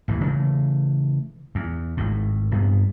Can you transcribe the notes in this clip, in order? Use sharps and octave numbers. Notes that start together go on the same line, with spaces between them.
A1 D#2 G#2 E3
C#3 E3 A3
E2
G#1 A2
C2 G2 B3